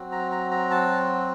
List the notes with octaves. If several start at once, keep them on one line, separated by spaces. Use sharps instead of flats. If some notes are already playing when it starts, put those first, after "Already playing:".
Already playing: F#3 C4 F#4
A#5
A#5
A#5
A5